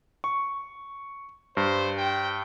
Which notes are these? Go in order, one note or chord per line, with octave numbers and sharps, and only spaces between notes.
C#6
G2 C5
G5